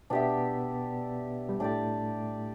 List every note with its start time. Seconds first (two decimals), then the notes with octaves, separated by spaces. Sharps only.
0.10 B2 B3 D4 G4 E5
1.49 G3
1.60 A2 A3 D4 G4 D5